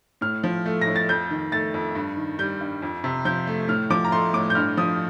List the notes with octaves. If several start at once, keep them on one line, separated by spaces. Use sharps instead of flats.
A2 F6
F3
A3
A#6
A2
A6
F2 G6
D#3
A3 A6
F2
G2
D#3
G3 G6
G2
F2
C3
F3 G6
A3
A2 F6
F3 D6
A#5
A3 C6
A2 D6
G6
G2 F6
F3 D#6